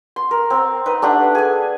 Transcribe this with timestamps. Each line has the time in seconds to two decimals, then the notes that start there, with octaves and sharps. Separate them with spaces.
0.16 C6
0.31 A#4
0.50 C4 A#4
0.86 D#4 B4 D#5
1.02 A3 D4 G4 F#5
1.35 G#4 G#5